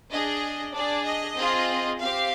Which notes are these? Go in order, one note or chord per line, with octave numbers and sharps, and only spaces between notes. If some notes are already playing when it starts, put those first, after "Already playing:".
D4 G#4 D#5
D4 G#4 D5
D#5
C4 F4 G#4
C4 G4 F5